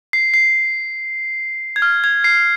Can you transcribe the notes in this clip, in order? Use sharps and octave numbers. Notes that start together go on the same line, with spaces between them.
C7
C7
G#6
F6
G#6
C7